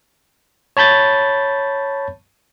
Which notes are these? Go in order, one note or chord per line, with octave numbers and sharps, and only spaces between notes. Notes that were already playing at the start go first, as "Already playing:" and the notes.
C#5 A5 B5 G6 A6